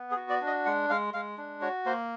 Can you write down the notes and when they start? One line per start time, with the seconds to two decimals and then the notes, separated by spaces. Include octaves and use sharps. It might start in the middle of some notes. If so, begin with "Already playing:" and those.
Already playing: B3
0.11 G#4
0.17 F#4
0.29 D5
0.41 D4
0.47 D#5
0.65 G#3 F#5
0.90 G#3 F5
1.14 G#3 F5
1.38 D4
1.61 F#4 C#5
1.86 A#3 C5